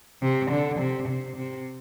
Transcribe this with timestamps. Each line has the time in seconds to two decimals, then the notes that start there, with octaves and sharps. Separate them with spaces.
0.22 C3
0.51 D3
0.79 C3
1.08 C3
1.36 C3